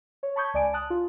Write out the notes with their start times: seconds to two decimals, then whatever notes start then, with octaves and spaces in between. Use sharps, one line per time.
0.23 C#5
0.36 A5 B5 C#6 D#6 G6 G#6
0.54 C#2 D5 G#5 D7
0.73 A5 D#6 F#6
0.90 F4